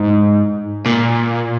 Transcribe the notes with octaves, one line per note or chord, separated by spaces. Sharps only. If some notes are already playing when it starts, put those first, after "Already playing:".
Already playing: G#2
A#2